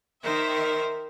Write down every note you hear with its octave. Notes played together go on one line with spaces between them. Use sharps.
D#3 A#4 C5 E5